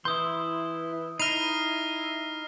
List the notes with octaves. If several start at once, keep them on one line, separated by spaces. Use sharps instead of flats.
E3 E4 C6 D#6 G6
D#4 E4 B5 F6 A#6 C7 D#7 F7